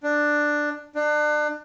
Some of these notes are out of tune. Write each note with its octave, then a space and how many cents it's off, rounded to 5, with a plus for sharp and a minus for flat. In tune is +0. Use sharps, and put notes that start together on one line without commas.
D4 +10
D4 +35